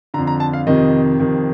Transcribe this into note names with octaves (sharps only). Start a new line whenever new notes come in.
F2 D3 A#5
A#5
A5
F5
F2 C3 D#3 D#5
F2 C3 D#3